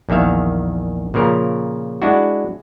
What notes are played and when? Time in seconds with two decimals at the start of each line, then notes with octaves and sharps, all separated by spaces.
0.09 A#1 E2 D#3 E5 F5
1.14 A#2 C#3 F3 A#4
2.02 G#3 D4 E4 F#4